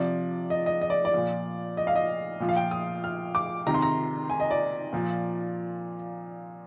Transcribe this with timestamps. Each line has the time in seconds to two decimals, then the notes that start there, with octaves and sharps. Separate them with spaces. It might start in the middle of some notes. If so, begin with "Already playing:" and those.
Already playing: C3 F3 D5
0.50 D#5
0.66 D#5
0.81 D#5
0.90 D5
1.05 D5
1.14 A#2 F3
1.77 D#5
1.87 F5
1.96 D#5
2.40 A#2 F3
2.49 F5
2.56 G5
2.71 D#6
3.04 F6
3.35 D6
3.67 C3 D#3 A#5
3.74 C6
3.82 A#5
4.30 G#5
4.40 D#5
4.51 D5
4.93 A#2 F3